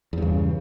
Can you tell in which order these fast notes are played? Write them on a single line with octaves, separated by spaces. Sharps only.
E2 G2 C#3